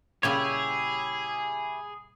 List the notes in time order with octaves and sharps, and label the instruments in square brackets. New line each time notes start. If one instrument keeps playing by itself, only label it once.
[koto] A#2 C#3 G3 [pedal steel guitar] E4 G4 C#5 [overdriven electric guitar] G#4